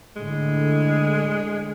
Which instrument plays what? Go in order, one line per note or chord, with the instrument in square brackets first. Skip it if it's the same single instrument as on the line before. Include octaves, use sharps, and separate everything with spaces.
[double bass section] A2 D3 [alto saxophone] G#3